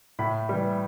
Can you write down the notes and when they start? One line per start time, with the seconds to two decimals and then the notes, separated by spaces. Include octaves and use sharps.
0.19 A2 B5
0.49 E3 G3